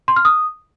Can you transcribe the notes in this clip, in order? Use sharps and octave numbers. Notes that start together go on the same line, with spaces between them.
C6
F6
D#6